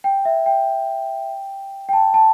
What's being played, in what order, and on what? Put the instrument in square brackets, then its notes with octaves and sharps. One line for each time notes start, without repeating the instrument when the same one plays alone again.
[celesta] G5
E5
G5
G5
A5
A5